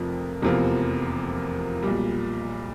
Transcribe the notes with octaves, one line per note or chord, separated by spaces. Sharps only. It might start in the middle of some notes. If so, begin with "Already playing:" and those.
Already playing: F1 F2 C3 A#3
F1 E2 C3 F3 A#3
B1 A#2 G3